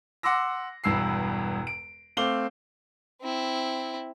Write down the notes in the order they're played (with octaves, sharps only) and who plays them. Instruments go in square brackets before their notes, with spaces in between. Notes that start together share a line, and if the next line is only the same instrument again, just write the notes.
[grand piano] F#5 C6 D6 E6 A#6
E1 E2 G2 E6 C7
D7
A3 C4 F5 D6 G7
[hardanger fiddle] C4 E4